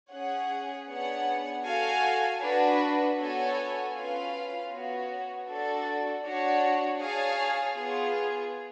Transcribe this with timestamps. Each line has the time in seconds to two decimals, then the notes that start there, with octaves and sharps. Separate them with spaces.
0.11 C#4 G#4 C#5 F#5
0.88 B3 D4 G#4 C#5 F#5
1.65 F#4 A4 F5 G#5
2.41 D4 F#4 B4
3.18 B3 F#4 A4 C#5 G#5
3.94 C#4 F4 B4 F5
4.71 B3 F#4 C#5
5.47 D4 F#4 A4 D5
6.23 D4 F#4 C#5
7.00 G#4 C#5 F5 A5
7.76 B3 F4 G#4